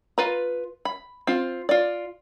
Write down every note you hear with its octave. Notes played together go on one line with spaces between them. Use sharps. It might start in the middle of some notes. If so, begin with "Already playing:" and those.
F4 B4 A#5
B5
C4 F4
F4 D5